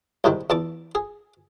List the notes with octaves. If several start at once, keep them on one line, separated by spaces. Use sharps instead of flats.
C2 G#2 C3 D#3
E2 A5 D6
G#4